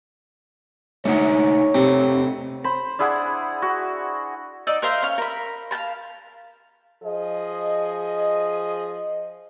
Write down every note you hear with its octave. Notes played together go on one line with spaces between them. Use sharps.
D2 A3 D#4 C#5 F#5
C3 A3 C4
C5 B5
D4 E4 G#4 F#5
F#4
D#4 D5 E6
A#4 C5 E5 F5
C#4 F5
A#4 B5
F5 G5 A5 B5
F3 G#4 D#5